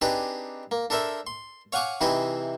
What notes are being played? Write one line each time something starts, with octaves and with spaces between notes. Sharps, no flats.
C4 D4 D#4 G4 G#4 B4
A#3
D4 A4 A#4 C5 E5
C6
C#5 F5 F#5 G#5 C#6 D6
C3 E3 C4 D#4 E4 G#4